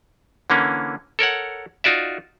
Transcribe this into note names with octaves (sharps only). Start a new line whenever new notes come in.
D3 E3 A#3 C#4
A4 A#4 C#5 F#5
D#4 F4 F#4 D5 E5